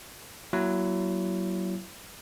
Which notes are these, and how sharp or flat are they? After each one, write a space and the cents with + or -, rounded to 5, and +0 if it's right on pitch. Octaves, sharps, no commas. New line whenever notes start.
F#3 +25 A#3 +25 E4 +30